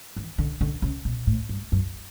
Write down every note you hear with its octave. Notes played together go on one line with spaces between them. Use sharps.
E3
D3
D3
C#3
B2
A2
G2
F#2